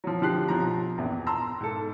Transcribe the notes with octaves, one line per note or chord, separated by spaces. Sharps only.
F3 F#3
D3 F3 G4 F#6 C7
B1 F3 A#5
A#1 E2
A5 A#5 C6 E6
G#2 A4